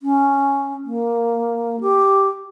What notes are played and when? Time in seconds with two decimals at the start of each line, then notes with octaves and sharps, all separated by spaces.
0.02 C#4
0.84 A#3
1.81 G4